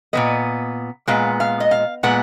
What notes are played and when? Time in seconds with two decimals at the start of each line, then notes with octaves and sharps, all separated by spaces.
0.13 A#2 G#3 B3 D#5
1.07 A#2 G#3 B3 F5
1.40 F5
1.60 D#5
1.71 F5
2.03 A#2 G#3 B3 F#5